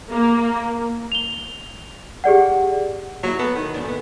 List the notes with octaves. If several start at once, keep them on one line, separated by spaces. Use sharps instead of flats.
A#3
F7 G7
G4 G#4 D5 F#5
F#3 A#3 C4 E4
B3 A4
D#3
E2 G#2 D4
D#2 B3